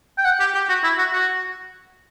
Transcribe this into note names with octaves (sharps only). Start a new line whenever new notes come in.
G5
F#5
G4
G4
F#4
E4
F#4
F#4